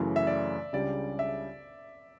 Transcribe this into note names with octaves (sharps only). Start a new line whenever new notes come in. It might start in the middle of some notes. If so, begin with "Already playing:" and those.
Already playing: F#2 C#3 E3 A3 E4
E5
D5
C#2 C#3 G3 D4 G4 D5
E5